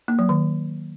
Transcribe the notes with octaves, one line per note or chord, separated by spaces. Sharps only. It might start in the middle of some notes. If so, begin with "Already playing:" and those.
A#3
F#3
D#3